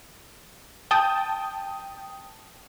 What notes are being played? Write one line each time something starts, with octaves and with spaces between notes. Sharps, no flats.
G5 A5 D#6